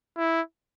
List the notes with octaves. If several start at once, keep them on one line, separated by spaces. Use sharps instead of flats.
E4